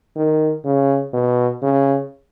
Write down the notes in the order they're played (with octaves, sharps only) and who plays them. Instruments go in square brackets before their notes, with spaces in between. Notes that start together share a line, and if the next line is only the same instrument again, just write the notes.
[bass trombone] D#3
C#3
B2
C#3